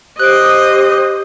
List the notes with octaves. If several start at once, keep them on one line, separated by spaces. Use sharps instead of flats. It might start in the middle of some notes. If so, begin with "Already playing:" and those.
G4 C5 D#5 F#6 D7